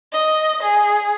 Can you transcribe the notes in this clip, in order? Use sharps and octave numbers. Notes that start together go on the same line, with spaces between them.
D#5
G#4